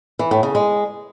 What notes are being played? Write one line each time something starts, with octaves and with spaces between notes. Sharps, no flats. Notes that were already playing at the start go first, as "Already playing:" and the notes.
E3
A2
C#3
G#3